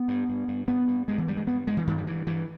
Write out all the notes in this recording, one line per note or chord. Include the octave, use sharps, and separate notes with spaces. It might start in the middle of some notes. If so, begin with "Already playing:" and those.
Already playing: B3
G2
G2
G2
G2 B3
G2
G2 G#3
E3
G2 G3
G#3
G2 B3
G2 G#3
E3
G2 D#3
G3
G2 E3
G2 E3